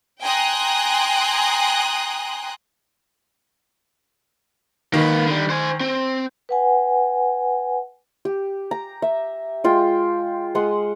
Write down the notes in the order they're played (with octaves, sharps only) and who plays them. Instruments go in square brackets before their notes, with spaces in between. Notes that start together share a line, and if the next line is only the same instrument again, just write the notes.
[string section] G5 G#5 A#5 C6 D#6 F#6
[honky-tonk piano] D#3 [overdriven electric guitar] A#3 B4
[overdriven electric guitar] D3 G3
C5 G#5
C4
[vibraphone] B4 F#5 G#5
[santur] G4
A#5
E5
G#3 F4 G5
G#3 F#5 C6 D#6